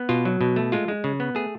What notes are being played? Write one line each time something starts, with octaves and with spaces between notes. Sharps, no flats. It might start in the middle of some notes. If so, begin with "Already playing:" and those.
Already playing: B3
B2 F4
F#3
B2
A3
G#3 F4
G#3
C#3
B3
A3 G#4